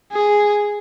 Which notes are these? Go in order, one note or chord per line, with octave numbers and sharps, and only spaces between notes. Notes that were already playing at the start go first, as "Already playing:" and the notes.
G#4